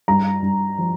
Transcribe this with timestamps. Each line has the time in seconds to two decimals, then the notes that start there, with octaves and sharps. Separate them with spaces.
0.08 G2 A#5
0.42 G2
0.78 F3